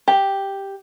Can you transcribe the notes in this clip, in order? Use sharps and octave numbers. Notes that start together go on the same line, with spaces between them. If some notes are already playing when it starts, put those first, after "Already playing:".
G4